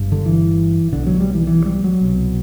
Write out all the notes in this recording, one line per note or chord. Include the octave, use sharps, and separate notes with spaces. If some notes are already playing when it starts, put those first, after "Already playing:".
Already playing: G1 G2
D3
E3
B1 B2 D3
F#3
G3
E3
E3
G3
F#3
C2 B2